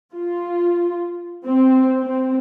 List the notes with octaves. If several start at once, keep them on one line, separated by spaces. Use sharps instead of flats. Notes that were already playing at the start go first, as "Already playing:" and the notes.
F4
C4
C4